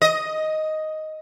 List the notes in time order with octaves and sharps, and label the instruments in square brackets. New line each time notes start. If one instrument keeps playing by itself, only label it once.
[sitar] D#5